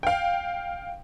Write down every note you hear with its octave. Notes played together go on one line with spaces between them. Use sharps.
F5 G5